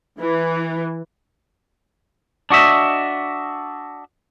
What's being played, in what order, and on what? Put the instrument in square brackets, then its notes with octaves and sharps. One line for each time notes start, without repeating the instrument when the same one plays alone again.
[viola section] E3
[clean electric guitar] D4 F#4 D#5 E5